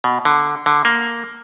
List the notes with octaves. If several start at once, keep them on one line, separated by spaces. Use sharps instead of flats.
B2
D3
D3
A#3